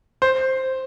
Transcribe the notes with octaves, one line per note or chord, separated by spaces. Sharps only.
C5